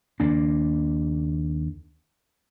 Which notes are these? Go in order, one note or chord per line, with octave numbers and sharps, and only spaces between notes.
D#2 A#3 D4